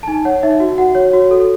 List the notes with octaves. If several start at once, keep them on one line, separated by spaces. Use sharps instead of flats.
A5
D#4 G#5
C#5 F#5
D#4 E5
F#4
F#4 F#5
C#5
F#4
A4